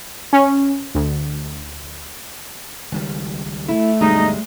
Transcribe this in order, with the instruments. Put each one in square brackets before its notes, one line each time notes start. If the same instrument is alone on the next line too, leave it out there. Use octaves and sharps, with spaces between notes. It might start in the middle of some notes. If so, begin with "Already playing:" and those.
[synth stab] C#4
D2
[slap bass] C#2 D#3 G3
[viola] A3 [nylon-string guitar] E4
[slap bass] D2 G2 B2 [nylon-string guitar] G3 G#3 [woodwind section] D#4 D#5